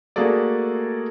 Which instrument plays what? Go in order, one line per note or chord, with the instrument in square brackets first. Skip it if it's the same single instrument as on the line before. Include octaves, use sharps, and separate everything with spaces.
[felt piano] A3 A#3 F#4 G#4 A4 D5